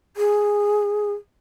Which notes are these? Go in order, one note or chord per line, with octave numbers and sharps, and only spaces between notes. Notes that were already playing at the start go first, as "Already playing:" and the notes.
G#4